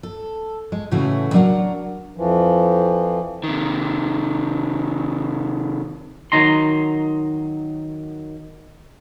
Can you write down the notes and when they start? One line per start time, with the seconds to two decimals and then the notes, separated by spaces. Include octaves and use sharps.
0.03 A4
0.72 G#3
0.91 A2 C#3 E3 A3 F#4
1.33 F#3 D4 A#4 F#5
2.17 F2 E3 F3
3.44 C3 D#3
6.32 D#3 F#3 D#4 A#5 C6